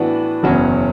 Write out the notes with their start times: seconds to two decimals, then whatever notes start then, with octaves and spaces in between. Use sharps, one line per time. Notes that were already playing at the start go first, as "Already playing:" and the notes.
Already playing: A2 E3 B3 D4 F#4
0.43 F#1 E2 B2 F#3 C#4